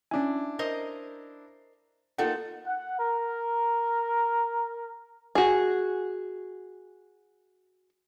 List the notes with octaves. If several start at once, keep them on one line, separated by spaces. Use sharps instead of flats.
C#4 D4 E4 G#5
A#4 C5 D#5
A#3 D#4 F4 A4 F#5 G5
F#5
A#4
F#4 G#4